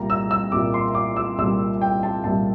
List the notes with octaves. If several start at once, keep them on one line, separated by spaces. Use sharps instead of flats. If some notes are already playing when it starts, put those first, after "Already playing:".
Already playing: C2 A#2 G3 A#5
E6
E6
C2 A#2 G3 D6
C6
D6
E6
C2 A#2 G3 E6
G5
A5
C2 A#2 G3 A5